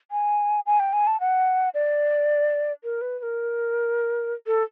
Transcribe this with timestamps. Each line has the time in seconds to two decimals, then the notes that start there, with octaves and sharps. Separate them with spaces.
0.11 G#5
0.66 G#5
0.80 G5
0.93 G#5
1.07 A5
1.20 F#5
1.74 D5
2.84 A#4
3.01 B4
3.19 B4
3.23 A#4
4.47 A4